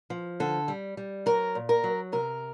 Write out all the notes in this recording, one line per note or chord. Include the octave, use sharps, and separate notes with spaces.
F3
D3 A4
G3
G3
F#3 A#4
A#2
A#4
F#3
C3 A#4